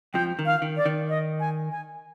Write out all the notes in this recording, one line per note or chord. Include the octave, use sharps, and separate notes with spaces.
F2 F3 G5
D#3
F5
D#3
D5
D#3
D#5
G#5
G#5